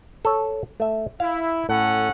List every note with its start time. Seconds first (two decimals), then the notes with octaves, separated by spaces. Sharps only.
0.25 A4 C#5
0.80 A3 E5
1.20 E4 F5
1.69 A2 C#4 A4 F#5